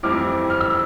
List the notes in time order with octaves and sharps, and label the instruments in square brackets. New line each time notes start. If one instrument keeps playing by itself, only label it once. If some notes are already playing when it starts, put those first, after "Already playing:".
[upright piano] F2 E3 G3 C4 E4 D6 F6
F6
E6